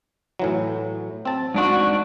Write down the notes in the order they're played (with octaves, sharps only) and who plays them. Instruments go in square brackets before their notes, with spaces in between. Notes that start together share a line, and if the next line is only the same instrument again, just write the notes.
[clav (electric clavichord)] A2 E3 F#3
C4 A5
[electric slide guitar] G#2 D4 F#4